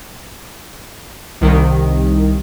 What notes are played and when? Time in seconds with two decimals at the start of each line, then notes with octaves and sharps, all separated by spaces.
1.41 C2 D#3